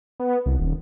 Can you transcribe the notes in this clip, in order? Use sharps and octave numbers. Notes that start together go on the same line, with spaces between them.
B3
C2
D#1